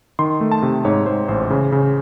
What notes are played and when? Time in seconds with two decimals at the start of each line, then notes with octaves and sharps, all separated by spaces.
0.19 D#3 C6
0.41 A3
0.51 A5
0.62 C3
0.85 G#2 C#5
1.06 G#2 C5
1.28 A1 C5
1.50 C#3
1.72 C#3